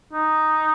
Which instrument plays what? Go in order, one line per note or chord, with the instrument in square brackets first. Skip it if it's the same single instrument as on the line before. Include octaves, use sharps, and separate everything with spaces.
[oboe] D#4